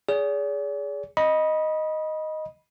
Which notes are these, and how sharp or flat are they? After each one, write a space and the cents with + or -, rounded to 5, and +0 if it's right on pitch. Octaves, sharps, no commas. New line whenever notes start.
G#4 +0 D5 -45
D#5 +0 B5 -25